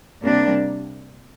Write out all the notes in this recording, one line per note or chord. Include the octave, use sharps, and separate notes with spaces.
C3 G3 A#3 D4